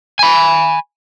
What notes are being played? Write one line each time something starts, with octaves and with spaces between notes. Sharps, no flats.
G#5 B5